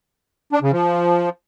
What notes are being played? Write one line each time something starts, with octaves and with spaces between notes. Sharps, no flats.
D4
C#3
F3